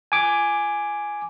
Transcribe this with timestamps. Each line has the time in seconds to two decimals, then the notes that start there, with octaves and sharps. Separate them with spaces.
0.12 G#5 D6